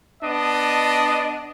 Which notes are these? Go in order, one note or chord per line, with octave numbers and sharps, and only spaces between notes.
B3 D4 D#5 A5